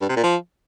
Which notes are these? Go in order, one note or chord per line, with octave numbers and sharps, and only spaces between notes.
G2
C3
A#2
F3